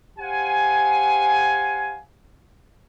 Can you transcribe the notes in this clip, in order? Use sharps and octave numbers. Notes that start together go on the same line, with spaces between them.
G4 C5 F5 F#5 G#5